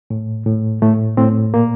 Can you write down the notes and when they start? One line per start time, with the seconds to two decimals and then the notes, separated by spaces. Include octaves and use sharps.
0.10 A2
0.46 A2
0.82 A2 A3
1.17 A2 C4
1.54 A#2 A#3